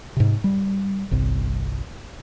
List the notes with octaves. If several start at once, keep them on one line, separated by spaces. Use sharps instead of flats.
G#2 C3
G3
G1 C2